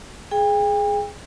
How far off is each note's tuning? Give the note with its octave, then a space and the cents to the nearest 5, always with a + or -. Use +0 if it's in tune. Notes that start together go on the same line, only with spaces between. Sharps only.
G#4 +10 G5 +40